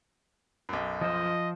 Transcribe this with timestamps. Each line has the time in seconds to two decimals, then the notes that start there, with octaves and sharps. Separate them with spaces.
0.69 B1 F#2
1.01 F3 F4 C5 D#5